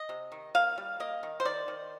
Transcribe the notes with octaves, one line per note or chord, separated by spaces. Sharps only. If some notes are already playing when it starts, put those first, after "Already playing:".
Already playing: D#5
C3
D#3
A#3 F5
G3
A#3 D#5
D#3
C5
D#3 D5
D#3